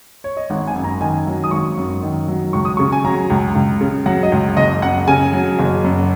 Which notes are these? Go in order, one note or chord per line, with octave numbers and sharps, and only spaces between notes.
C#5
D#5
G#1 F#5
G#5
F#2
A#5
D#3 G#5
F#3
D#6
G#1 C#6
F#2
D#3
F#3
C#2 C#6
D#6
C#3 C#6
G#5
F#3 A#5
C#2
C#2
C#3
F#3 F#5
D#5
C#2
F#1 D#5
F#2 F#5
C#3 G#5
F#3
F#1
F#2